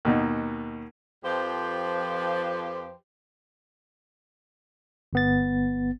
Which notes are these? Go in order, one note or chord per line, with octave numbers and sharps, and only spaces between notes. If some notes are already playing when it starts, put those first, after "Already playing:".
D#2 B2 D#4
F2 F3 G4 B4 C5
G1 B3 A6